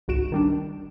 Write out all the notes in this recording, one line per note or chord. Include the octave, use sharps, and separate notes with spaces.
G#1 C#2 F#4 D7 E7
D#3 G3 D4